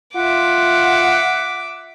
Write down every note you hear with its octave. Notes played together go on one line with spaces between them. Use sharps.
F4 E5 F#5 D6